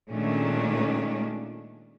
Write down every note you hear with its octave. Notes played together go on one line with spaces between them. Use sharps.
A#2 D#3 G#3 A3 C#4 D4